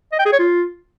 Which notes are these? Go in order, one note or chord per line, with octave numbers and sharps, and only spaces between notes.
D#5
G5
G#4
C#5
F4